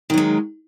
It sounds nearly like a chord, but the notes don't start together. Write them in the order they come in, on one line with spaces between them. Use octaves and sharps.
D#3 F#3 G#3